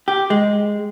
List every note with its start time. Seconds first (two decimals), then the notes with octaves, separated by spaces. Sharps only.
0.08 G4
0.30 G#3